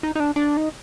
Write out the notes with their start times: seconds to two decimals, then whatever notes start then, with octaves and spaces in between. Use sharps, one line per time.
0.03 D#4
0.15 D#4
0.20 D4
0.36 D4
0.57 D#4